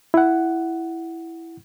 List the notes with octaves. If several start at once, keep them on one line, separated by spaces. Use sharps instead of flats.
E4 F#5